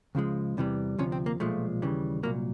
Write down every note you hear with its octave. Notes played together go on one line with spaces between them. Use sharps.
C#2 C#3 F3 G#3
E2 C3 E3 G3
D2 C3 F3 C#4
C4
A#3
B1 A#2 F3 G#3 A3
D#2 C#3 E3 G3
C2 A#2 F#3 A#3